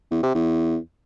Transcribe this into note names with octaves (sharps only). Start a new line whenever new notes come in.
E2
C3
E2